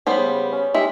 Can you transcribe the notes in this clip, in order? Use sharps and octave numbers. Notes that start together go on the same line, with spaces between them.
C#3 G3 B3 C5
C#4
G#3 G4 E5